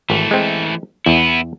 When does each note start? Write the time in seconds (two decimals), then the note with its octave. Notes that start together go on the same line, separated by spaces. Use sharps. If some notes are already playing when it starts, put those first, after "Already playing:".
0.10 G#1 E3 A3
0.31 G#3 C4
1.06 E2 E3 B3 E4